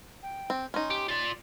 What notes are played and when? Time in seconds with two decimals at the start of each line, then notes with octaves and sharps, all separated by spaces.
0.22 G5
0.50 C4
0.74 C#4 D#4 C6
0.90 G4
1.08 F4 D5 C6